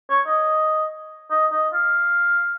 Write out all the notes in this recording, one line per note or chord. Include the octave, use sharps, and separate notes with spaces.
C#5
D#5
D#5
D#5
F5